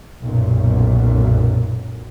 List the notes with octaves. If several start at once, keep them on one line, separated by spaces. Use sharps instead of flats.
B1 F#2 A#2